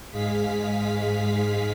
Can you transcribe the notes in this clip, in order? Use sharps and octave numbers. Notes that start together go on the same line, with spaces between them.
G#2 G#3 G#4 F5 B6